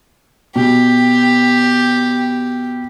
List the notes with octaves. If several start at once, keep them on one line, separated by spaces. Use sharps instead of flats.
B2 G4